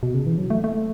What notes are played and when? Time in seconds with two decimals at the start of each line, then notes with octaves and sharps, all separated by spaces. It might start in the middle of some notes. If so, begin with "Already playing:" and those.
0.03 B2
0.14 C#3
0.26 E3
0.38 F#3
0.50 A3
0.64 A3